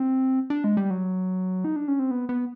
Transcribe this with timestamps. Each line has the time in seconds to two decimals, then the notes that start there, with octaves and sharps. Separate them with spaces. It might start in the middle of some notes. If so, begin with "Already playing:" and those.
Already playing: C4
0.50 D4
0.64 G#3
0.77 G3
0.90 F#3
1.64 D#4
1.76 D4
1.88 C#4
1.99 C4
2.11 B3
2.29 B3